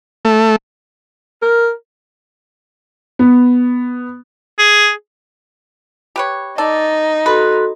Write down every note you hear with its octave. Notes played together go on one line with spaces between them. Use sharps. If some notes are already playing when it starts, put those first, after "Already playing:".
A3
A#4
B3
G#4
G4 B4 C#5
D#4 A4 D5
F#4 A4 B4 C6